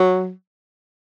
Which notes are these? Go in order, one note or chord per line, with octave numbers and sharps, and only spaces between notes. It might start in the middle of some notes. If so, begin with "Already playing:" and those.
Already playing: F#3